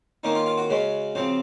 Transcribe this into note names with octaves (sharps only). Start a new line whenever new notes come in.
D#3 A#3 C#4 D#4
F4
F4
F#4
C#3 G#3 C#4
C#3 F3 C4